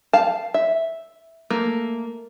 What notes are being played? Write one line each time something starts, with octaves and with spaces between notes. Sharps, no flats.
F5 A5
E5
A3 A#3